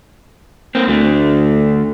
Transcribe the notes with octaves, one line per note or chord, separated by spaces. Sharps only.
A#3 C4
D2 D3 A3